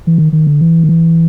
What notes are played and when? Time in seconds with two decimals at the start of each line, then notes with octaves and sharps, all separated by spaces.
0.07 E3
0.18 D#3
0.33 D#3
0.47 D3
0.61 E3
0.83 D#3
0.89 E3